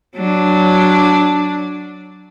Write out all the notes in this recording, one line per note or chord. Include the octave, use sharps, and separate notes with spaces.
F#3 D4